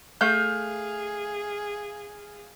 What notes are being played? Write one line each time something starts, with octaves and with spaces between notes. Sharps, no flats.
A3 G#4 F5 G6